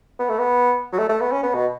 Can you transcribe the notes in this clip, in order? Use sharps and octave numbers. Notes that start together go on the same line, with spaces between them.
B3
A3
B3
F#3
A3
A3
B3
C#4
B3
B2